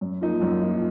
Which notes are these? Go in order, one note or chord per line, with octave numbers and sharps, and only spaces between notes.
F#2
F3 A#3 D#4
F#2
F3 A#3 D#4